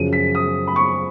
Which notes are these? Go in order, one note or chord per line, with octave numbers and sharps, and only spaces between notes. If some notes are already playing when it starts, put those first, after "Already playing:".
Already playing: F#2 C#3 F3 D#7
B6
D#6
B5
C#6